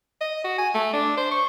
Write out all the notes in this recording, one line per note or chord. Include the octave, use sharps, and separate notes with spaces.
D#5
F#4
G#5
A3
D4
C5
C#6